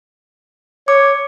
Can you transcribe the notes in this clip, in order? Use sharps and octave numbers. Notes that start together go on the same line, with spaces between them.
C#5 D6